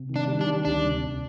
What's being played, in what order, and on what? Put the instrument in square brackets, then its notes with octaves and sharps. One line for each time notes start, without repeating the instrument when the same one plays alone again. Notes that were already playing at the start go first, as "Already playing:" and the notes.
Already playing: [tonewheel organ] C3
D#3
[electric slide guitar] D4
[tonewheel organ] G3
[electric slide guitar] D4
[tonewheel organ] D#3
[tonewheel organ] D2 [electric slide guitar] D4
[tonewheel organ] C3
C3